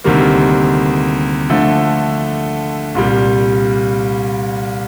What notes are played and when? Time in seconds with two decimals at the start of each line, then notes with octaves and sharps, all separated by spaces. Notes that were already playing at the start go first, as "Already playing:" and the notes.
0.04 D2 C3 D#3 G3 A#3
1.50 D3 F3 A3
2.95 C2 A#2 G3